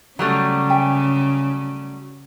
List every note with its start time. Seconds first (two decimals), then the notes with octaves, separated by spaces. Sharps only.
0.19 C#3 F#3 G3 A3
0.69 E5 G5 G#5